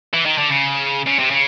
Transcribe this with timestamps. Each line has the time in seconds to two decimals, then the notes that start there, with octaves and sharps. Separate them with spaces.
0.14 E3
0.26 D#3
0.38 D3
0.49 C#3
1.07 C#3
1.19 C3
1.30 C#3